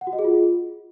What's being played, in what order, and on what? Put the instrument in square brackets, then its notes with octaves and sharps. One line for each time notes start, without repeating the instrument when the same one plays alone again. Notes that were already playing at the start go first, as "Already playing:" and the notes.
[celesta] F#5
F#4
D#5
G#4
F4